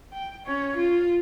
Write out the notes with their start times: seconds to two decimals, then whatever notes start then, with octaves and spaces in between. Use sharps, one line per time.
0.12 G5
0.46 C#4 C#5
0.77 F4